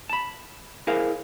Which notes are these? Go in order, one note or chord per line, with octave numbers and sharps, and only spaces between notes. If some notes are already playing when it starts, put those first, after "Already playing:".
A5 B5
E4 G#4 A#4 C5 F5